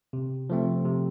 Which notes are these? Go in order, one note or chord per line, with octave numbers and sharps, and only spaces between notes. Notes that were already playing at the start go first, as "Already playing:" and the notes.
C3
F3 A3 C4
C3